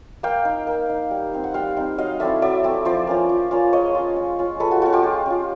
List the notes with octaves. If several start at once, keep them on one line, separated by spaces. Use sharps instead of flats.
A#3 F5 G5
D#4
A#3
D#4
G3
C4 D#4
F#5
G3 F5 G5
C4 D#4
F#3 D#5 F5
A3 C4 E4 D5 E5
F#3 D5 E5
A3 C4 E4
F3 C5 D5
A#3 C#4 F4
F3
A#3 C#4 F4
G#3 C#5 D#5
C#4 F4
G#3
C#4 F4
G#3 A4 B4
F#4
C#4 F4 F#4
F4 G4
G#3
C#4 F4